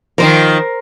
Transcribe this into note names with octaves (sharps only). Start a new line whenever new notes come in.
D#3 F3 A#4 C5